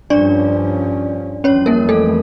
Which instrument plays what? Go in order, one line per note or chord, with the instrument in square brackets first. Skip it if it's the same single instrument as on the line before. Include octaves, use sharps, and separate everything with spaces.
[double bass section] G2 F3 C#4 [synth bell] D4 D5
[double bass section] F2 E3 G3 [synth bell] C#4 C#5
[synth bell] A#3 A#4
A3 A4